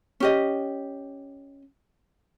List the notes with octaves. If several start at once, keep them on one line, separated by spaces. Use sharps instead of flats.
C#4 G4 D#5